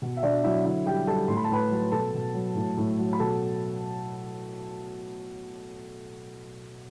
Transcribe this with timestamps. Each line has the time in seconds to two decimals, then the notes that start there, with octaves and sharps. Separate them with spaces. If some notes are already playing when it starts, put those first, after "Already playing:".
0.02 B2
0.17 E5
0.23 B2 D4 D5
0.44 F#3 E4 E5
0.65 D3 E4 E5
0.86 G3 G4 G5
1.07 G3 A4 A5
1.28 A2 C6
1.37 B5
1.44 A5
1.50 A2 B4 B5
1.70 F#3
1.91 B2 A4 A5
2.14 B2
2.34 F#3
2.55 A2
2.77 A2
2.98 F#3
3.13 B5
3.19 B2 A4 A5